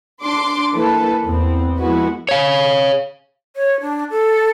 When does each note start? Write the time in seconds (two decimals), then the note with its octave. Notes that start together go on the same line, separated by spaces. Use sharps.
0.22 D4 C6 D6
0.73 E3 A#3 A4 B4
1.25 E2 B3 C4
1.79 F3 G#3 B3 E4 F#4 B4
2.29 C#5 F5
3.56 C#5
3.81 D4
4.11 A4